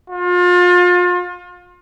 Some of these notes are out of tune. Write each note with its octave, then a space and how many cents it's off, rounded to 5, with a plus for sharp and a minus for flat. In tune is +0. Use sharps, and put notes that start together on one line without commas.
F4 +35